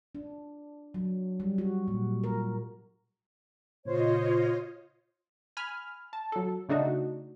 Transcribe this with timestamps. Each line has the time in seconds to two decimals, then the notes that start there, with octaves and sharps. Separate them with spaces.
0.15 D4
0.94 F#3
1.40 G3
1.58 F#4
1.88 A#2
2.24 A#4
3.85 A#2 C#3 F4 C5 C#5 D#5
5.57 G#5 B5 F6
6.13 A5
6.32 F#3 A4
6.69 C#3 A3 D4 D#4 F#4